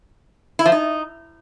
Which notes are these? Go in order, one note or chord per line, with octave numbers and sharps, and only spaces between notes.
E4
F3
D#4